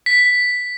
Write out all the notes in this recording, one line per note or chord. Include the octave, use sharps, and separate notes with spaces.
B6